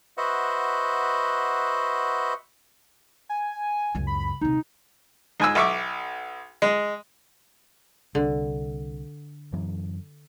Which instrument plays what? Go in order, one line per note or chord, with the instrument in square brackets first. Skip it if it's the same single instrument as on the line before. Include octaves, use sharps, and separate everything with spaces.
[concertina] F#4 B4 C5 D#5 E5 F#5
[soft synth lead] G#5
[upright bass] C#2 F#2
[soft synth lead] B5
[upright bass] D#1 C3 [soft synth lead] D#4
[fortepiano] G#2 G#5 E6
B1 E5 C#6 D6
G#3
[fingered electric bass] C2 [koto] D3
[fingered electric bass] F#2 E3